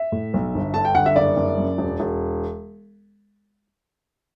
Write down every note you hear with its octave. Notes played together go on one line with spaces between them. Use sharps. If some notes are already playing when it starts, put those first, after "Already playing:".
Already playing: E5
A2
B1
G1
D3 A5
G5
G1 F#5
E5
F#1 D5
F#1
F#2
E1
E1